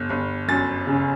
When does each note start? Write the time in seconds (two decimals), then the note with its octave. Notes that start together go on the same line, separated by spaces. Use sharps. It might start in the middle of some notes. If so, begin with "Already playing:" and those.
Already playing: G1
0.10 G1
0.48 F#2 A6
0.87 C#3